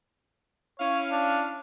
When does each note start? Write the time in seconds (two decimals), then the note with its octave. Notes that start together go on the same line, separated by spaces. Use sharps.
0.80 C#4 E4 C#5 F5
1.11 D4